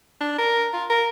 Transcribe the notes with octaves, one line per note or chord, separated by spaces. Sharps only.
D4
A#4
F4
A#4